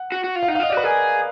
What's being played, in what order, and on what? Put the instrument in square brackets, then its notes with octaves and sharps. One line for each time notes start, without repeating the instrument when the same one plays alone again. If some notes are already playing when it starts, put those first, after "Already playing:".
Already playing: [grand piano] F#5
[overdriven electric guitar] F#4
F#4
F4
[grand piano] F5
[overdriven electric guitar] D#4 [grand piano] F#5
[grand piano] F5
[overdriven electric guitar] F4 [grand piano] D#5
[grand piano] D5
[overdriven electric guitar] F#4 [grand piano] B4
[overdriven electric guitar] G#4 [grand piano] A#4